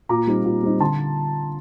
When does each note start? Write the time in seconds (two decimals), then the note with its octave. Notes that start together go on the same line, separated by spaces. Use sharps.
0.09 A#2 A#5 D6
0.27 G3 C4 D#4
0.45 A#2
0.63 G3 C4 D#4
0.80 D3 A5 C6